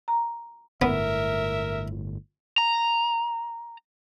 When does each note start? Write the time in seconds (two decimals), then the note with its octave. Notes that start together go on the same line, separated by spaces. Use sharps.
0.08 A#5
0.82 G1 A2 B3 A#4 E5
2.58 A#5